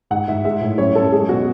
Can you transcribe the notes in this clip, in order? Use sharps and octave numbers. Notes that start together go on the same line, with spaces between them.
G#2 F#5
G#2 E5
G#3 E5
A2
F#2 C#5
F#2 A4
G#3 G#4
B2 F#4